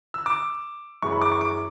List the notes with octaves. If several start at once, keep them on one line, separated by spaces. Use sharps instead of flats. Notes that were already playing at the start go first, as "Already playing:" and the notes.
E6
D6
F#2 E3 G#3 C#6
B5
D6
C#6
D6